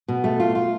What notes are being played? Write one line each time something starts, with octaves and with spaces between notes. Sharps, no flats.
B2
A3
F4
F4